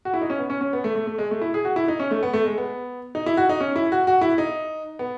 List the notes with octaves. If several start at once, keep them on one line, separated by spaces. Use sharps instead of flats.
F#4
E4
D#4
C#4
B3
C#4
C#4
B3
A3
A3
A3
G#3
A3
E4
G#4
F#4
E4
D#4
C#4
A3
B3
A3
G#3
B3
D#4
E4
F#4
D#4
C#4
E4
F#4
F#4
E4
D#4
B3